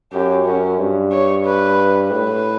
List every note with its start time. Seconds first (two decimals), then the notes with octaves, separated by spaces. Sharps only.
0.13 F#2 G4
0.46 F#2 C#4
0.79 G2
1.12 C#5
1.46 B4
2.12 A2 B4